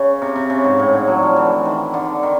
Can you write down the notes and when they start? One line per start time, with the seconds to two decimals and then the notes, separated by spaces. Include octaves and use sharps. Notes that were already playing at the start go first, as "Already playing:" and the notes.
Already playing: C#3
0.22 C3
0.36 C3
0.50 C#3
0.64 G#2
0.79 A2
0.93 D3
1.07 F#3
1.23 F3
1.36 E3
1.65 D#3
1.94 D3
2.23 D#3